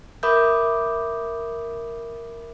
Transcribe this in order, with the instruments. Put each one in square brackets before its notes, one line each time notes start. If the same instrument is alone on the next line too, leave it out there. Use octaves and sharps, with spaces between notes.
[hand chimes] A#4 E5 B5 D6 D#6 G6